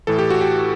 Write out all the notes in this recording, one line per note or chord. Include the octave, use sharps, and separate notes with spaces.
A2 E3 A4
G4
F#4
G4